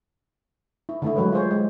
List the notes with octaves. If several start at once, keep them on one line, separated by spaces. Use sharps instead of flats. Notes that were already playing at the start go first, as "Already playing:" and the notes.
E4
D3 A3 E4
E3 F#3 G#3 B4 C#5
F4 G#4 C5 C#5
G#3